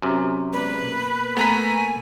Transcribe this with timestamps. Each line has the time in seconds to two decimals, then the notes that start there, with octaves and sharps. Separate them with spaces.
0.02 F#2 C3
0.53 G#3 B3 B4 D5
0.82 B2 A#3
1.37 A3 B3 B4 G#5 A#5 B6